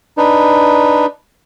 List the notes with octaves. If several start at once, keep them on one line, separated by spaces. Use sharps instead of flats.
D4 D#4 B4